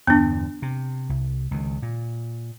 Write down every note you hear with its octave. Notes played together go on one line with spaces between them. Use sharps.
E2 G2 D3 B3 D4
C3
C2
C#2 D#3
A#2